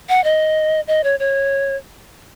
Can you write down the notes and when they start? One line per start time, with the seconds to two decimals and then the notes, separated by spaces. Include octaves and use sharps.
0.09 F#5
0.24 D#5
0.87 D#5
1.04 C#5
1.20 C#5